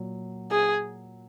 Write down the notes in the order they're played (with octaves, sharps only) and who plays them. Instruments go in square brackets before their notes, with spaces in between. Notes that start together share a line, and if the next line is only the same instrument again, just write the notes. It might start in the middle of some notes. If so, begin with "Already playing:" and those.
Already playing: [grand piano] A#2 F#3
[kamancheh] G#4